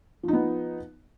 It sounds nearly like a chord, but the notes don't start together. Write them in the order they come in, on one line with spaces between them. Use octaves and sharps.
F3 D#4 B3